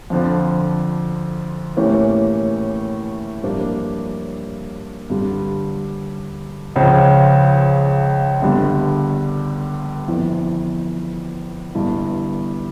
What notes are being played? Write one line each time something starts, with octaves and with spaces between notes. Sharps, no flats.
F2 D3 F3
A2 E3 A#3 C#4 G4
G2 F3 A#3 D4 G4
G2 D3 G3
C#2 C#3 F3
G1 G2 D3 G3
G1 F2 E3
G1 G2 E3